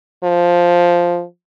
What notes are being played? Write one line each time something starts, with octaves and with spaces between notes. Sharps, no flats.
F3